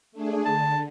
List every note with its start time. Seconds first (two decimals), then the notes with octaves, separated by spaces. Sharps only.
0.12 A3 D4 G#4
0.45 D3 A5